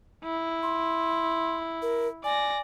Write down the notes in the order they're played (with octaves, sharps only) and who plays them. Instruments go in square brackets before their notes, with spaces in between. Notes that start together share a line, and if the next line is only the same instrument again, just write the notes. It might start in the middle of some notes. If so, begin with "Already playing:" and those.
[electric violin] E4
[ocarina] C6
A#4
[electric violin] D5 A#6 [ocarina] G#5